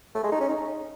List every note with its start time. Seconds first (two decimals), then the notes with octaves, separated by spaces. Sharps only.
0.15 A3
0.24 G#3
0.32 D#4
0.41 C#4
0.49 D#4